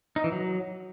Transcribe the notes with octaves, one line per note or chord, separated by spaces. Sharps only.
D#4
E3
F#3